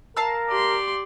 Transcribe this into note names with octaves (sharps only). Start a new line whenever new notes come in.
A#4 F5 A5 E6
G4 D5 C6